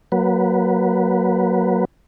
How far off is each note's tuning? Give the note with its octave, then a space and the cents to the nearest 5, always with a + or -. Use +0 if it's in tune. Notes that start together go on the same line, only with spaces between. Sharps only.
F#3 +0 A#3 +0 B4 +0